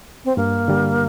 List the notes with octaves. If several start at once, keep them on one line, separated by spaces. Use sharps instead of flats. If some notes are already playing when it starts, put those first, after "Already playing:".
C4
G2 A#3
D3 G3